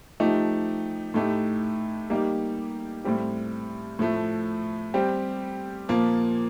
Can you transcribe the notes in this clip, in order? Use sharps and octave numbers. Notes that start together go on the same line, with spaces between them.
F3 A3 D#4 G4
A2 A3 D#4 G4
G3 A#3 D#4 G4
A2 G3 C4
A2 F3 A3
G3 C4 G4
A#2 F3 A#3